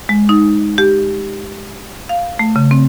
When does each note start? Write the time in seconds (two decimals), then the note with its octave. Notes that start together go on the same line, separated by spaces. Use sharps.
0.09 G#3
0.29 D#4
0.78 G4
2.09 F5
2.39 A3
2.56 C#3
2.71 C4